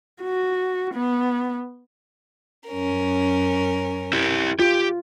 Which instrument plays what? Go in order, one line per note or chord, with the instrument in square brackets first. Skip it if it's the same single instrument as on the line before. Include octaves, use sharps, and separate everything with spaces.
[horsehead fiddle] F#4
B3
[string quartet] F#2 C#4 A#4
[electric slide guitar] E4 G4
[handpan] F4 [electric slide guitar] G4